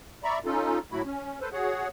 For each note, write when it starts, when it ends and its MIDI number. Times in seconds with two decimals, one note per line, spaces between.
0.24 0.39 74
0.24 0.39 76
0.24 0.39 82
0.24 0.39 83
0.24 0.39 85
0.45 0.79 61
0.45 0.79 63
0.45 0.79 65
0.45 0.79 69
0.92 1.02 45
0.92 1.02 54
0.92 1.02 57
0.92 1.02 64
0.92 1.02 66
0.92 1.02 83
1.05 1.39 61
1.41 1.49 69
1.41 1.49 71
1.41 1.49 72
1.52 1.88 66
1.52 1.88 68
1.52 1.88 73
1.52 1.88 78